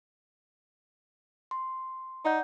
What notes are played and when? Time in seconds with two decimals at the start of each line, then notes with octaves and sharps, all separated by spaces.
1.51 C6
2.25 D#4 D5 F#5 G6